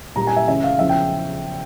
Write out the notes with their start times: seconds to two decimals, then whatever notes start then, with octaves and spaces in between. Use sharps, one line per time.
0.16 A#2 G3 A#3 A#5
0.27 G#5
0.37 E5
0.47 C#3 E3 G#3 C#4 E5
0.64 F5
0.79 E2 C#3 F3 E5
0.89 G5